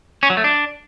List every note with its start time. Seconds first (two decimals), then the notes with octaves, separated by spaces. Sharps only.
0.23 C#4
0.30 F#3
0.37 A3
0.44 D4